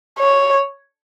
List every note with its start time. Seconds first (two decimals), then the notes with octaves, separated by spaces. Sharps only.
0.19 C#5